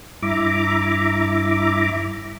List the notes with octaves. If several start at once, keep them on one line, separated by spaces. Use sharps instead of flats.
G2 E4 E5 A#5 D6